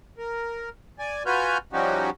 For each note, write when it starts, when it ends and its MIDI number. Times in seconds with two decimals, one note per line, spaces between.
0.18 0.69 70
0.99 1.23 74
0.99 1.23 80
1.26 1.58 65
1.26 1.58 66
1.26 1.58 71
1.26 1.58 80
1.26 1.58 89
1.26 1.58 91
1.73 2.10 53
1.73 2.10 55
1.73 2.10 61
1.73 2.10 63
1.73 2.10 66
1.73 2.10 67